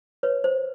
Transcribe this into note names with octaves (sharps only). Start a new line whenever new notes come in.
B4 C#5
C5